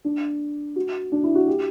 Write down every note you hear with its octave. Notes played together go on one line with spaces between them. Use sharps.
D4
F#4
D4
E4
F#4
G4